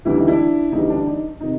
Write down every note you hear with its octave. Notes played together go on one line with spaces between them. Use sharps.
D2 C#3 E3 G3 E4
D#4
D4 E4
D2 C#3 E3 G3 D#4
D4
D#4
C3 D#3 D#4